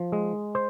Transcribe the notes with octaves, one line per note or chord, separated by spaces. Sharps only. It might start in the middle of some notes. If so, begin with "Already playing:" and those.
Already playing: F3
G#3
C5